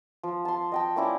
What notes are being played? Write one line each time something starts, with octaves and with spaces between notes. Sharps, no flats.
F3
A5 C6
D#5 G5 A5
A#3 C#4 E4 D5